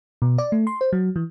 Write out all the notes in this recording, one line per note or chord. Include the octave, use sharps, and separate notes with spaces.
B2
D5
A3
C6
C5
F#3
E3